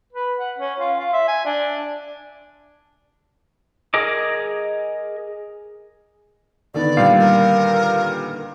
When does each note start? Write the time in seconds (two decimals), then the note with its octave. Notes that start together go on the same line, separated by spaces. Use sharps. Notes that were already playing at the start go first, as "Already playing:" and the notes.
0.13 B4
0.39 F#5
0.58 C#4
0.80 F4
0.99 F4
1.14 E5
1.28 G#5
1.46 D4
3.94 G#4 A#4 D#5 D6
6.74 D3 D#3 B3 D5
6.97 A#2 G3 F5
7.20 A#4